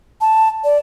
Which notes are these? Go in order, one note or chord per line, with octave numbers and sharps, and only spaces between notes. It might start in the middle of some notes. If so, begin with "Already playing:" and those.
A5
D5